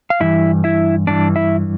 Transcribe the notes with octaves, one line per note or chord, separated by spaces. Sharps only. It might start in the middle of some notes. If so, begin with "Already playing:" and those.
F5
G2 E3 E4 E5
E4 E5
G2 E3 D4 D5
E4 E5